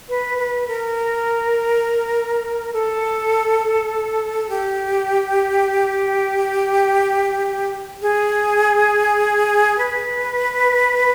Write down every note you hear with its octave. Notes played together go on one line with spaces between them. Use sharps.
B4
B4
A#4
A4
G4
G#4
B4